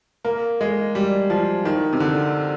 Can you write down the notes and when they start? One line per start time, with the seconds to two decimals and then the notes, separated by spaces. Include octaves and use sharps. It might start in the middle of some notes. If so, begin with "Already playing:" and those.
0.25 A#3
0.61 G#3
0.95 G3
1.30 F3
1.65 D#3
1.93 C3
2.00 D3